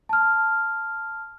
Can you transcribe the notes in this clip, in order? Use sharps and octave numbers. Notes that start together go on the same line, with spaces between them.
A5 F6